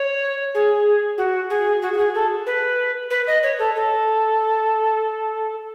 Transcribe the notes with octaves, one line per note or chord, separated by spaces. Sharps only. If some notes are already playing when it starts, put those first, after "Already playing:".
Already playing: C#5
G#4
F#4
G#4
F#4
F#4
G#4
A4
B4
B4
D#5
C#5
A4
A4